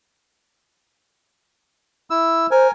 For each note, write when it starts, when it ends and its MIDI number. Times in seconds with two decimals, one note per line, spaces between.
2.10 2.47 64
2.10 2.47 88
2.51 2.71 70
2.51 2.68 72
2.51 2.71 80